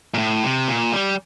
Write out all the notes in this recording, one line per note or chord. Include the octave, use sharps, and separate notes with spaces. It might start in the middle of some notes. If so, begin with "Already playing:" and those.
A#2
A2
C3
A#2
G3